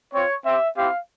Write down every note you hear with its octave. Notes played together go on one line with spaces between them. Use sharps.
C4 F4 C#5
C4 G4 E5
C4 E4 G4 F5